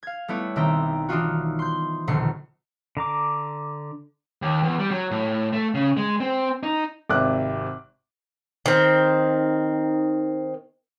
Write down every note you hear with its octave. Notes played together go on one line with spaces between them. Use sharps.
F5 G#6
G3 A3 B3 E4 C#5
B1 D#3 C4 E5 G5 A#5
E3 D4 D#4 F4 F#4
C6 G6
D#1 A#1 B2 D3 C7 C#7
D3 A#5 D6
D#2
E2
G3
F#3
A2
A3
C#3
G#3
C4
D#4
G#1 C3 D6 F#6
D#3 C4